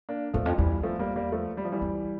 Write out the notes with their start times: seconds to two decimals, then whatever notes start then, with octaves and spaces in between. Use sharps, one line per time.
0.09 A#3 D4
0.34 E2 F3 A3
0.46 F2
0.58 E2 E3 G3
0.83 F3 A3
0.99 G3 A#3
1.16 G3 A#3
1.32 F3 A3
1.57 G3
1.65 F3
1.72 E3 G3
1.82 F2